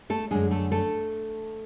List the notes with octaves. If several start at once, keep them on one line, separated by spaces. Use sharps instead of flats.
A3 A4
F#2 D3 G#3 G#4
A3 A4
A3 A4